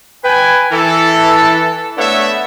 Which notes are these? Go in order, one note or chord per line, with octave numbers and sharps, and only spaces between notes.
B4 G5 G#5
E3 A4
A3 B3 D4 A4 C#5 E5